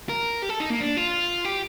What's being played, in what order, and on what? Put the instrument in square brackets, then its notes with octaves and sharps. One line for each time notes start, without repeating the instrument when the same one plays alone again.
[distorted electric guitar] A#4
G4
A4
D#4
A#3
D4
F4
G4